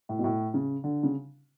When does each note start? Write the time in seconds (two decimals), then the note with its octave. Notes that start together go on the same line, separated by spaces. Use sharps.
0.09 A2
0.19 B2
0.24 A2
0.54 C#3
0.84 D3
1.03 C#3